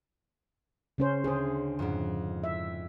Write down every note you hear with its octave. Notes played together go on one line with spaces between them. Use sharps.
C#3 C#4 C5
D2 G#4 C5
F2 G#2
E5